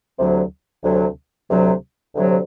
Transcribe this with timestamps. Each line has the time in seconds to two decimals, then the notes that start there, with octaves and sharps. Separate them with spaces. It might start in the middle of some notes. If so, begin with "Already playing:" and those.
0.18 D2 C3 F#3
0.84 D2 C3 F#3
1.49 D2 C3 F#3
2.15 D2 C3 F#3